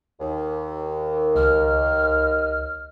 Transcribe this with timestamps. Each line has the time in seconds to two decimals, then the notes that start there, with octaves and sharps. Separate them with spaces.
0.20 D#2
1.36 C#2 D#5 F6